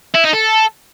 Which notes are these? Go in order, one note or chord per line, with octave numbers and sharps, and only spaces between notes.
E4
D#4
A4